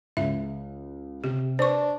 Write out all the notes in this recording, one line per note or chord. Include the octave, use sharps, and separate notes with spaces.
C#2 E5
C3 G4
D4 B4 C5 C#6